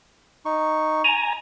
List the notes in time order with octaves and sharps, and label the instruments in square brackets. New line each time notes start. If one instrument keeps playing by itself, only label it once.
[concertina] D#4 C#6
[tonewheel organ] G#5 A#5